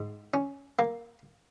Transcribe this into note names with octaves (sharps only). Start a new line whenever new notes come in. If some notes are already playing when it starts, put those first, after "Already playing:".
Already playing: G#2
C#4
A#3